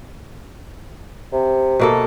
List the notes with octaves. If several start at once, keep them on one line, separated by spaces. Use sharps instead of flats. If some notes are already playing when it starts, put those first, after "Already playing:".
C3
B2 A#3 A4